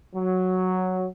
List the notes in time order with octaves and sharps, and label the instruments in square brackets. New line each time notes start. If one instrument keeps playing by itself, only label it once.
[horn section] F#3